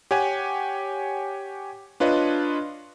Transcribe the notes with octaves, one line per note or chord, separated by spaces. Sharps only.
G4 C#5 F#5 G#5
D4 F4 B4 C#5 D#5